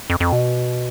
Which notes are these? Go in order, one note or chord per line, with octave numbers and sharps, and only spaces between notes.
F2
F2
B2